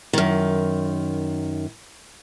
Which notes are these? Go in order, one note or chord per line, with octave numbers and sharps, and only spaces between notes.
F#2 D#3